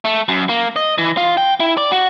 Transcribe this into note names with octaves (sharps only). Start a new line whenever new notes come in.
A3
F#2
A#3
D#5
E3
F4
G5
E4
D5
F#4